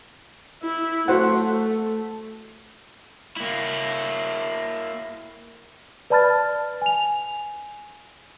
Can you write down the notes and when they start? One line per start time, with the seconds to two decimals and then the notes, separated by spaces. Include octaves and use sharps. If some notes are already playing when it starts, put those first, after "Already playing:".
0.63 E4
1.08 A3 F#4 C5 F#5
3.36 A#3 E4
6.10 B4 D5 A5 B5 F6 A6
6.82 G#5 F7